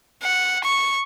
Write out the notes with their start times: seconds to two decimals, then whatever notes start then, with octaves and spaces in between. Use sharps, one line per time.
0.23 F#5
0.64 C#6